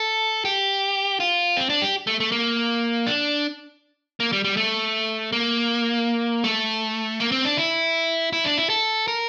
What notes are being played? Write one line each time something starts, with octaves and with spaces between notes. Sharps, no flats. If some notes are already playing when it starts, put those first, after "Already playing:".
Already playing: A4
G4
F4
C4
D4
G4
A3
A3
A#3
D4
A#3
G3
G3
A3
A#3
A3
A#3
C4
D4
E4
E4
D4
E4
A4
A#4